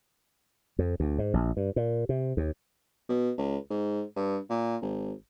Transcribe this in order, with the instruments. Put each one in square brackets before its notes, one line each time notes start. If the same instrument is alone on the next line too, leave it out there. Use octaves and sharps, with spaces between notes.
[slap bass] F2
D2
G#2
A#1
G2
A#2
C3
D#2
[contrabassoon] B2
C#2
G#2
G2
A#2
G#1